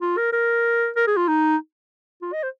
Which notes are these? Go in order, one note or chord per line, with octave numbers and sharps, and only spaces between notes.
F4
A#4
A#4
A#4
G#4
F4
D#4
F4
D#5
C5